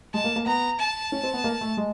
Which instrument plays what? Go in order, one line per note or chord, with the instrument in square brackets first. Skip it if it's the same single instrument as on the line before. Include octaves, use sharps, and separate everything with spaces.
[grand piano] G#3 [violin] A5
[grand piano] A#3
A#3
[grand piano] B3 [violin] A#5
[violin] A5
[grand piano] C#4
C4
B3
A#3
A3
G#3